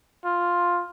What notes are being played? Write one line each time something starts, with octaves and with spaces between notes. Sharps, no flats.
F4